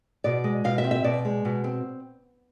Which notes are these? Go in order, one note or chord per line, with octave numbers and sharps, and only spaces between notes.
B2 D5
G#3
B2 F5
E5
C4
E5
B2 D5
G#3
B2
C4